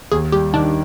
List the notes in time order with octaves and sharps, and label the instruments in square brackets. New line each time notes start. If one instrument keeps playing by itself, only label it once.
[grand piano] D#2 [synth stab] G#4
[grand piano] G3 [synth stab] G4
[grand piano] D#3 [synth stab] D4